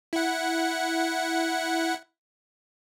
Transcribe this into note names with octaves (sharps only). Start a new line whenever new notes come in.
E4 F#5